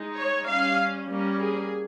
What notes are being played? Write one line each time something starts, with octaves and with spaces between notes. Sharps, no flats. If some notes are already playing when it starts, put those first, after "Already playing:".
Already playing: G#3 D#4
C#5
G3 C#4 F5
G3 A#3 C#4
G#4